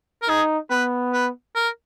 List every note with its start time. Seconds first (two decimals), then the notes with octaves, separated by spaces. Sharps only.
0.22 A#4
0.28 D#4 G#4
0.71 B3 B4
1.13 B4
1.56 A#4